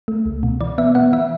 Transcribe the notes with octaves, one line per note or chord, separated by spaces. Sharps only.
A3
C#2
B2
E3 D5
B3 E5
B3 F#5
E3 E5